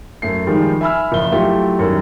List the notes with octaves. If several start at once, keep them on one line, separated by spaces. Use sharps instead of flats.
F#2 A3 C7
D#3 F3 G3 G#3 D#4
E5 G#5 B5 E6 F6
F#1 F3 E5 G7
F#3 A3 E4 F4 G4
F#2 D#3 G3